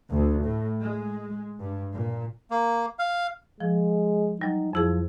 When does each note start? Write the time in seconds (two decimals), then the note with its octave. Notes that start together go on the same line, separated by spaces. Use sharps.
0.10 D2
0.44 A2
0.81 G#3
1.59 G2
1.94 A#2
2.51 A#3
2.99 F5
3.60 F3 G#3
4.41 F#3 G3 D#4
4.73 F2 F3 E4 G#4